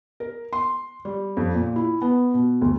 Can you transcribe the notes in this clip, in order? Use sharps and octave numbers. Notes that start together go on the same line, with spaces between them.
A#4
C6
G3
F2
A#2
E4
B3
B2
D2